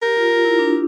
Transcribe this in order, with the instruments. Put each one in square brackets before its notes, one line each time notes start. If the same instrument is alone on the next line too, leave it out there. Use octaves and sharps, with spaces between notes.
[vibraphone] G4 [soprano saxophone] A#4
[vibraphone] F4
F4
E4
D4